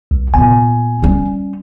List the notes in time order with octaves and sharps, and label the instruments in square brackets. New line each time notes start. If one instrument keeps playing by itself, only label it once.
[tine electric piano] C2
[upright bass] A#2 B3 [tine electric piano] G#5
[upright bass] G3 C#4